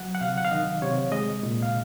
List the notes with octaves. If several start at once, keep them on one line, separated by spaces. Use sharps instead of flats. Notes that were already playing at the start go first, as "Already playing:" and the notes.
Already playing: F#3 F#5
F#5
C3 F5
F#5
F5
D#3 D#5
C3 C#5
G#3 D#5
A#2
F5